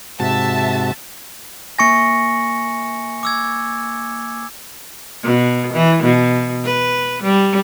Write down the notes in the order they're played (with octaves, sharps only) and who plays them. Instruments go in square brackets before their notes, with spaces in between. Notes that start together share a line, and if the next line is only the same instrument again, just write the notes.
[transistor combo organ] G#2 C3 F#4 [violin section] E5 A5
[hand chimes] A#3 C#6 A#6 [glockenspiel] G#5 C#7
[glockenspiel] D6 E6 G#6
[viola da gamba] B2
E3
B2
B4
G3